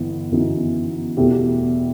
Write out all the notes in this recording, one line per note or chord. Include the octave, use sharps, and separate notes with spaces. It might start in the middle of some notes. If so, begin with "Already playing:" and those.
Already playing: G1 E3 B3
G1 F#2 E3 B3 D#4
E2 B2 A3 E4 G4